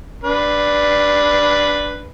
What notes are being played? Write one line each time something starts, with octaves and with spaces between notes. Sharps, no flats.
D4 B4